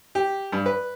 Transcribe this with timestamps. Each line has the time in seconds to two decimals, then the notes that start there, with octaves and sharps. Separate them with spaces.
0.15 G4
0.52 G2
0.66 B4